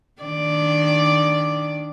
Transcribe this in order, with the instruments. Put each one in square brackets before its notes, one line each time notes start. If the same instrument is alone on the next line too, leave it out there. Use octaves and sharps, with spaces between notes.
[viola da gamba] D#3 D4 D5